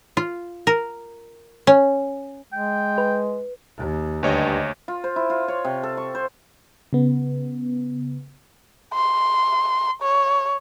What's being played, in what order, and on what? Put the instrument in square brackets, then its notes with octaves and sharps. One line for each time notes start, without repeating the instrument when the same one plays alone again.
[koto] F4
A#4
C#4
[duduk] G#3 [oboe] G5
[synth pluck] B4
[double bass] D#2
[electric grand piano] D2 C#5 D#5 [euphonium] G2
[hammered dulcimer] F4
C5
E4
F4
C#5
C3
A4
C#6
C5
[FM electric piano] C#3 B3
[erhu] C6
C#5